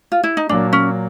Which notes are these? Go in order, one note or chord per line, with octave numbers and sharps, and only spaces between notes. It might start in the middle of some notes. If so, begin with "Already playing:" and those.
F4
E4
D#4
A#2 F#3 A#3 D4
C#4